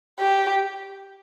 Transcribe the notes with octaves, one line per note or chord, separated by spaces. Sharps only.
G4